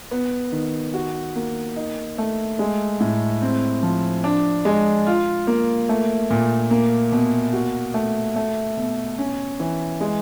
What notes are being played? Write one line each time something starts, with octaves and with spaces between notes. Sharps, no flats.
B3
D#3
F#4
A#3
D#4
A3
G#3
A2
C4
F3
D4
G#3
F4
A#3
A3
A#2
A#3
B2
F#4
A3
A3
B2
C#4
E3
G#3